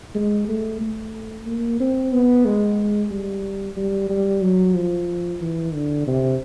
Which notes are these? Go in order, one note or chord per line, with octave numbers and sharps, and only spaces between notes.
G#3
A3
A3
A#3
C4
B3
G#3
G3
G3
G3
F#3
F3
E3
D3
C3